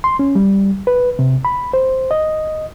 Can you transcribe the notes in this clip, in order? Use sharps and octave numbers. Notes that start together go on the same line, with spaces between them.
C6
C#4
G3
B4
C3
B5
C5
D#5